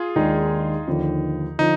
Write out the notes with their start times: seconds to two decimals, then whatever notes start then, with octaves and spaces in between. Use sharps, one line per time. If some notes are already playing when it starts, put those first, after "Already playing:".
Already playing: F4 G#4
0.16 D#2 D#3 G#3 D4 D#4
0.87 D#2 D3 F3
1.58 D3 F3 D#4